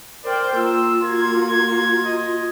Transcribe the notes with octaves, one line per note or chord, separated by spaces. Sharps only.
A#4 C5 D5 G5
A#3 F4 E6
A#3 F#4 G#6
D#5